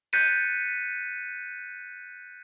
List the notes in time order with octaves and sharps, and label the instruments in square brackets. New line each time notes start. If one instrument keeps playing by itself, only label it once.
[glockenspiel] F#6 G6 A6 B6 C#7 D#7